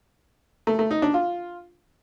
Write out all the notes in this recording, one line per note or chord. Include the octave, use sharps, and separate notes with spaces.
A3
A3
D#4
D4
F4